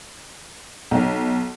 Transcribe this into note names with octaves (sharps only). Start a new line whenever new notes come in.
B1